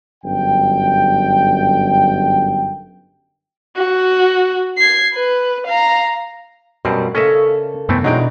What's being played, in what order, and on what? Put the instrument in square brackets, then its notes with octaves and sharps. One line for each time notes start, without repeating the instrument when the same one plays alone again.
[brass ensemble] G1 F#2 G5
[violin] F#4
G#6 C7
B4
F5 A#5
[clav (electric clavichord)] F#2 B2 C4 [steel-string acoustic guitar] G3
[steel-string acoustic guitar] C#3 A#3 A4 [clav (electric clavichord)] C#4 D#5 E5
[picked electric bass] F#2 C3 B3 [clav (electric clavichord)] E3 A3 C4
[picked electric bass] B2 [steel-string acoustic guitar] E3 D4 D#4 [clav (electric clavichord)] F#3 G#3 G5